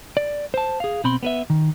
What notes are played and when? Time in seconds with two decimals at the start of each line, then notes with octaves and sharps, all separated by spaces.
0.17 D5
0.54 C5 A5
0.80 G#4 F5
1.04 B2 C4 B5 C6
1.23 B3 B4 E5
1.50 D#3